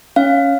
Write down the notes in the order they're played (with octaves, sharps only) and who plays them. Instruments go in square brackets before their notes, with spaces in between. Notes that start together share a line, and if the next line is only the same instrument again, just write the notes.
[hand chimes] C#4 F5